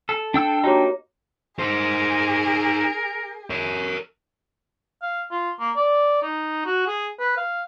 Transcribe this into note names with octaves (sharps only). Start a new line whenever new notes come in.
A4
D4 G5 E6
A#3 D#4 F#4 G4 C#5
D#4 G#4 A#4 C5
A#4 C#5
F5
F4
A#3
D5
D#4
F#4
G#4
B4
F5